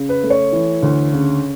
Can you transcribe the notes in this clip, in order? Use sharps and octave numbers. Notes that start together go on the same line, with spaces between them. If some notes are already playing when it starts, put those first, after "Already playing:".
Already playing: C#3
B4
A3
C#5
E3
D2
C#3